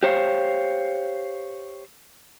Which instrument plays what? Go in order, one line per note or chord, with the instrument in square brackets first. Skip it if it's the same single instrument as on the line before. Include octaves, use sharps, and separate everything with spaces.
[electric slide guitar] G4 C5 C#5 F5